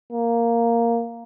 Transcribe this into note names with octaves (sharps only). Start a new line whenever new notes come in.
A#3